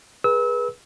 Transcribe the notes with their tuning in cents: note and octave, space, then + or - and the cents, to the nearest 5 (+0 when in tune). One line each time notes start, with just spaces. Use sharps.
G#4 +0 B4 -30 E6 -30